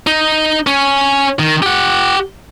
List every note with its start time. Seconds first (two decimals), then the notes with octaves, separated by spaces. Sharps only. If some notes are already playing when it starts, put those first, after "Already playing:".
0.07 D#4
0.67 C#4
1.40 D#3
1.63 G4 F#5